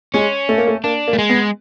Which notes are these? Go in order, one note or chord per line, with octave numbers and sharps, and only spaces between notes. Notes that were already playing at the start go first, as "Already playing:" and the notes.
G#3 C#4
A3
A#3
A3
A#3 D4
A#3
A3
G#3
B3